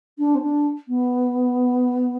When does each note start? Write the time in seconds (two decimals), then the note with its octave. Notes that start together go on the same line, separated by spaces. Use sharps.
0.18 D4
0.34 C4
0.41 D4
0.88 B3